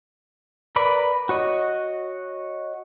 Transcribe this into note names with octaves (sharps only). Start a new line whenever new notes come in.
A#4 B4 D5 B5
F#4 C#5 D#5